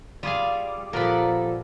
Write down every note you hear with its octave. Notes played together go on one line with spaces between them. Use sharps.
G3 F4 G#4 F5
A#2 F3 B3 A4 A#4 D5 B5